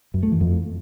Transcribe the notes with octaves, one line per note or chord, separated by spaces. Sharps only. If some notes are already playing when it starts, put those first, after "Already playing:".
F#2
A3
E3
F2